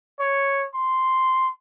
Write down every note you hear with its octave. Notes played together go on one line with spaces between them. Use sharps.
C#5
C6